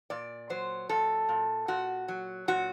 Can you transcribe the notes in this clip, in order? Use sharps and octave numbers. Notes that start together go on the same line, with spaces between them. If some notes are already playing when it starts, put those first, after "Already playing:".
A#2 D5
F#3 C5
A#2 A4
A#2
A#2 F#4
F#3
A#2 F#4